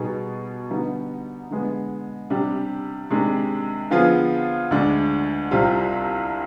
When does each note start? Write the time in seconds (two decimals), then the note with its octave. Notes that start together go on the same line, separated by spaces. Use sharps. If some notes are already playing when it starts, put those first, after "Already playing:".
Already playing: B2 G3 B3 D#4 G#4
0.70 D3 G3 B3 D#4
1.50 D3 G#3 B3
2.30 C3 G3 D4 G4
3.10 C3 D#3 G#3 D4
3.90 D3 F3 B3 F4 G#4
4.71 D2 D3 G#3 D4
5.51 C2 C3 G3 C4 F4